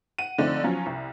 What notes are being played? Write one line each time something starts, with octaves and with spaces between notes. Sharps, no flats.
F#5 D#7
D3 F3 A3 C4 D4 D#4
F3 F#3 C#4
C2